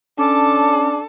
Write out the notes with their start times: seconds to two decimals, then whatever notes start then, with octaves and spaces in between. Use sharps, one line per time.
0.19 C#4 D4 A4 D6